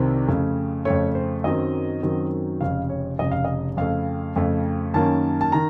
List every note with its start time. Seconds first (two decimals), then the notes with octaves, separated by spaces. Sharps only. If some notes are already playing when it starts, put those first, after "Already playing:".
Already playing: C2 C3 D#3 C4
0.28 F2 C#3 A3
0.85 F2 C#3 A3 C#5
1.15 C5
1.44 F#2 D#3 F#3 C4 D#5
2.03 F#2 D#3 F#3 C4
2.61 F1 F2 C#3 F5
2.89 C#5
3.19 F1 F2 C#3 D#5
3.31 F5
3.45 D#5
3.77 F2 C#3 A3 F5
4.36 F2 C#3 A3
4.94 F#2 D#3 A#3 C#4 A5
5.41 A5
5.52 D#3 A#5